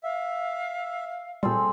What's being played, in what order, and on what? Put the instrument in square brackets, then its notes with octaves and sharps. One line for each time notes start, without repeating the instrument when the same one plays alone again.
[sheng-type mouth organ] E5 [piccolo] F5
[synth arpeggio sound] A#2 G3 [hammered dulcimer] C4 G#4 A4